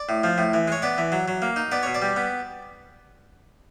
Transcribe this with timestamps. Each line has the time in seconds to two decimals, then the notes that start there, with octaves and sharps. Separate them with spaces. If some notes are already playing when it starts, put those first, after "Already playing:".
Already playing: D5
0.09 A2
0.24 F3
0.38 A2
0.54 E3
0.68 G#3 C#5
0.82 B3 D5
0.98 E3
1.12 F#3
1.28 F#3
1.42 A#3
1.56 D#4
1.72 B3 D5
1.83 B2 C#5
1.94 D5
2.02 G3
2.16 B3